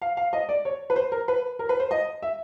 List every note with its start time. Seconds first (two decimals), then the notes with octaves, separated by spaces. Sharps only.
0.02 F5
0.17 F5
0.33 D#5
0.49 D5
0.65 C#5
0.90 B4
0.96 C5
1.12 A#4
1.28 B4
1.59 A#4
1.69 B4
1.80 C5
1.91 D#5
2.22 E5